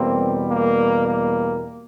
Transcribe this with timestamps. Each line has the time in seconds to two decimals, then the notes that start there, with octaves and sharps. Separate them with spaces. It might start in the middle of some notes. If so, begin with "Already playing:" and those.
Already playing: E2 B2 G3 A#3 C4
0.50 A#3
1.07 A#3